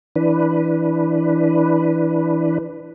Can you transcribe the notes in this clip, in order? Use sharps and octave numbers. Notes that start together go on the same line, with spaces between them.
E3 D4 B4